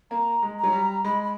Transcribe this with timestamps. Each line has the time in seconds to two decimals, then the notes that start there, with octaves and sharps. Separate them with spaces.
0.10 A#3 A#5
0.43 G#3
0.57 A#5
0.63 F#3
0.72 G3
1.04 G#3 B5
1.23 B5